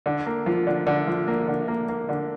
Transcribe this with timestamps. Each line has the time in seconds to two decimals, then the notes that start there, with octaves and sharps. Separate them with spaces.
0.06 D3
0.26 A#3
0.46 F3
0.67 D3
0.87 D3
1.07 F3
1.28 A#3
1.48 D3
1.68 A#3
1.89 A#3
2.09 D3